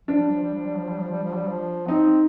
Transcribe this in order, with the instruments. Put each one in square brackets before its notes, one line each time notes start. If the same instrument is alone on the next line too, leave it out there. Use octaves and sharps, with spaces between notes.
[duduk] F3 [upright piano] D4
[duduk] G3
F3
G3
F3
G3
F3
G3
F3
G3
F3
G3
F3
[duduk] C4 [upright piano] D#4